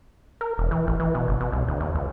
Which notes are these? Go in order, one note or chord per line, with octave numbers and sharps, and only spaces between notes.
A#4
E1
E3
A1
E3
B2
G1
B2
C2
D2
D#2
C#2